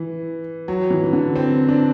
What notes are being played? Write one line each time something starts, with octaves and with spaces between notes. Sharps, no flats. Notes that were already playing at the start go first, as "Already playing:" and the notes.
Already playing: E3
F#3
E3
E3
D3
C4
D4